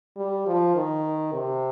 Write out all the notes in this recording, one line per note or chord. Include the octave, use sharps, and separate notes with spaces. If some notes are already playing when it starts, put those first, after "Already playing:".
G3
F3
D#3
C3